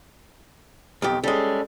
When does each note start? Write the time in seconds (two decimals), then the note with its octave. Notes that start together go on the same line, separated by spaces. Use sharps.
1.02 B1 F2 G4
1.24 G3 G#3 C#4 A4